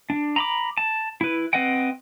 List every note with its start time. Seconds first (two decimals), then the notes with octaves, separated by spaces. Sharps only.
0.10 D4
0.36 A#5 B5 D6
0.78 A5
1.21 E4 B4
1.53 C4 B4 D#5 F#5 G5